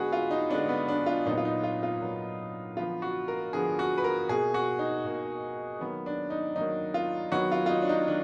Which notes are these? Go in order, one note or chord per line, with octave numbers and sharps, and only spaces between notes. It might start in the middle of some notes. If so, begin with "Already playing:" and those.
Already playing: D3 G#3 B3 F#4 G#4 B4
F4
D#4
D3 G#3 B3 D4
B3
D4
F4
A#2 F#3 B3 D#4
F4
D#4
F4
F4
A#2 F#3 B3
D3 F3 B3 F4
F#4
A#4
D3 F3 B3 G#4
F#4
B4
A#4
B2 A#3 G#4
F#4
D#4
B2 A#3
D#3 F#3 A#3 B3
D4
D#4
D#3 F#3 A#3 D#4
F4
D#3 F#3 B3 F#4
F4
F4
D#4
D4
D#4
D#3 D4